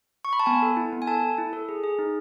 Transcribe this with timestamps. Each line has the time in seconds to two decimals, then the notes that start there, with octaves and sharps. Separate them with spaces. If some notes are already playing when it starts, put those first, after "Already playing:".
0.25 C#6
0.33 B5
0.40 A5
0.46 B3 G#5
0.62 A4
0.77 E4
0.93 B3
1.02 G#5
1.07 A4 A5
1.22 A4
1.38 E4
1.53 A4
1.69 G#4
1.84 G#4
1.99 D#4